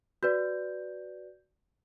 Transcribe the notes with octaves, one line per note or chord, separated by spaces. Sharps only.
F#4 B4 D5 G6